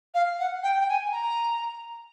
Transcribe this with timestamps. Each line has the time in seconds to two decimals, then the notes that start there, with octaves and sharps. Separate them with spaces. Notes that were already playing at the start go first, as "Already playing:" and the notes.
0.14 F5
0.39 F#5
0.63 G5
0.80 G5
0.89 G#5
1.13 A#5